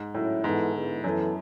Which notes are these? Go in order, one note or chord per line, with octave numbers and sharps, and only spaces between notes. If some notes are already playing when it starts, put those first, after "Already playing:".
Already playing: G#2
A2 F#3 C#4 E4
G#2 E3 B3 E4 A4
D3 G#3 B3 E4
F#2 E3 B3 E4 A4